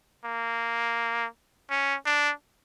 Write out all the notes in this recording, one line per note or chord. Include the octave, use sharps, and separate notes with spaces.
A#3
C#4
D4